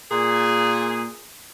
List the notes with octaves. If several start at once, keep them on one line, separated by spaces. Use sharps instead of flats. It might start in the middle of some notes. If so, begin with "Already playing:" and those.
A#2 G#4